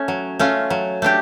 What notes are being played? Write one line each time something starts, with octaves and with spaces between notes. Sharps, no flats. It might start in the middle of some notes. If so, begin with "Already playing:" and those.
Already playing: A3 C#4
F#3
A3 C#4 F4
F#3
A3 D4 G4